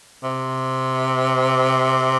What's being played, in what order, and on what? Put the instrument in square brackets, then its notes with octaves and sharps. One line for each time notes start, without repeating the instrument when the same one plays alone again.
[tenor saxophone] C3